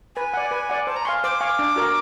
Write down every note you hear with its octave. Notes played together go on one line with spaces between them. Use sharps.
B4 G#5
D5 F#5
B4
D5 F#5
C5 A5
A#5
F5 G#5 C6 C#6
C5 D6
F5 G#5 C#6
D4
F#4 A#4